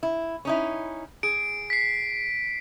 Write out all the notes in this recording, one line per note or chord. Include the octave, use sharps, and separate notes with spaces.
E4
C#4 D#4 E4
G#4 D7
B6 C7